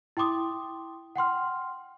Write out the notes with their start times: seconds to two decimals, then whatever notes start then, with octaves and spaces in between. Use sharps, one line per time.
0.17 E4 G5 C6 D6 D#6
1.16 F#5 G5 C6 F6